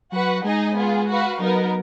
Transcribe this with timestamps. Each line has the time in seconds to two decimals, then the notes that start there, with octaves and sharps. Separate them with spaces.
0.12 F#3 F#4 B4 F#5
0.44 G#3 D#4 G#4 D#5 G#5
0.76 B3 F4 G#4
1.08 F#4 B4 F5
1.40 F#3 B3 D#4 A#4